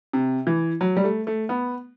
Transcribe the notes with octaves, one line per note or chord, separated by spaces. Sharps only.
C3
E3
F#3
G3
A3
A3
B3